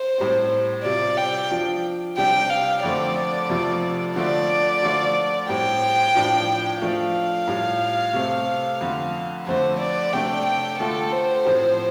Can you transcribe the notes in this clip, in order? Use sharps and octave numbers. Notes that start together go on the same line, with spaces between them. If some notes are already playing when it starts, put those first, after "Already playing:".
Already playing: C5
A2 G3 C4
C3 G3 F4 D5
G5
F3 D4 F4
C3 G3 D4 G4 G5
F5
F2 D3 A3 C4 D5
F2 C3 F3 A3 F4
D3 F3 A3 D4 F4 D5
D3 F3 A3 F4
A2 G3 C4 G5
A2 F3 D4 F4
F3 A3 D4 F4 F5
A2 G3 F4
C3 A3 C4
F2 D3 A3
F2 D3 A3 C5
D5
C3 A3 D4 G4 G5
G5
D3 A3 F4 A4
C5
A2 F3 C4 G4